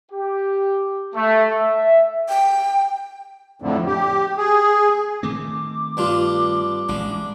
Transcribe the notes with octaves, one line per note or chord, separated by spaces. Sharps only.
G4
A3
E5
G5
F2 A2 D3
G4
G#4
D#3 A3 C4 D6
G2 D4 F4
A1 G#3 D4